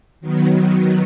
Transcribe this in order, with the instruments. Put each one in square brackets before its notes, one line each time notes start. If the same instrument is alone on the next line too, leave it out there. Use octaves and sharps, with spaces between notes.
[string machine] D#3 F#3 B3